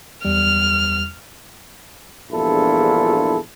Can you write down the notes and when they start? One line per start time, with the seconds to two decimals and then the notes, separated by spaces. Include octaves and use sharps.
0.25 E2 G3 F6
2.32 A#1 E2 G2 E4 F4 A4